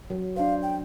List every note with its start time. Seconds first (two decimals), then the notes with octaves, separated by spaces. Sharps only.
0.10 F#3
0.36 D4 C5 F5
0.62 G5